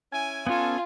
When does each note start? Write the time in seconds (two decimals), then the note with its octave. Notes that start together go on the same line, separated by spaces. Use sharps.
0.13 C#4 E4 G#5
0.47 B3 C#4 F4 A4 G#5